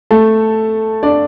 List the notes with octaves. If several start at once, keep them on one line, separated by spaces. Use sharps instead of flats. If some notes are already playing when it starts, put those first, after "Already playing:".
A3 A4
D4 D5